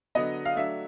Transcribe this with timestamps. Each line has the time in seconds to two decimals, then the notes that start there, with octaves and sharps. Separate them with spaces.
0.15 D3 F#3 B3 D#5
0.45 F5
0.56 F#3 A3 D4 E5